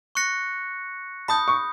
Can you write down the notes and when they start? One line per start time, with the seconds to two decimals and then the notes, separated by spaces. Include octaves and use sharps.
0.15 C#6 F#6 A#6 C#7
1.28 A5 B5 D#6 G6
1.48 C#6